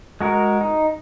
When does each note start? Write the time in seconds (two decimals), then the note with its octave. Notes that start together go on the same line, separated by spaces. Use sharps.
0.21 G#3 F#4 A#4
0.61 D#4